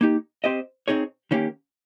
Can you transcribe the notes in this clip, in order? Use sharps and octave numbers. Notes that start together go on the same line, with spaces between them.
A#3 D#4 G4
C4 G4 C5 D#5
C4 D#4 G#4 C#5
D#3 A#3 C#4 G4